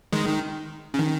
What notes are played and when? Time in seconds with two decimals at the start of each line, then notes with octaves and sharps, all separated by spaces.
0.12 D#3 G#3
0.27 D#3
0.94 C#3
0.99 D#3